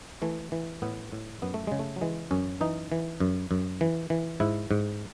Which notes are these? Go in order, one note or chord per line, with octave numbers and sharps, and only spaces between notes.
E3 A3
E3
A2 B3
A2
F#2 B3
A3
C#3 G#3
A3
F#3
E3 G#3
F#2 C#4
E3 D#4
E3
F#2
F#2
E3
E3
G#2 E4
G#2